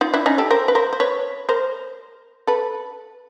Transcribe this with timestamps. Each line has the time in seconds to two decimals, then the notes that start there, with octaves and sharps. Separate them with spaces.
0.01 D#4 F4
0.14 D4 E4
0.26 C#4 D#4
0.38 G4 A4
0.51 A#4 C5
0.68 B4
0.75 A#4 C5
0.93 C5
1.00 B4 C#5
1.49 A#4 C5
2.47 A4 B4